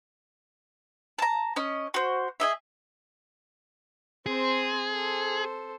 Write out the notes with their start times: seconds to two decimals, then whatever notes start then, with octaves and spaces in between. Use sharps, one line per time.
1.19 A5 A#5
1.56 C#4 D#5
1.94 F#4 C5
2.40 G#4 D#5 E5
4.26 C4 G#4 C5
4.92 A4 C5